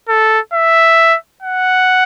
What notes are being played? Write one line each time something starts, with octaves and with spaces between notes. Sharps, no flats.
A4
E5
F#5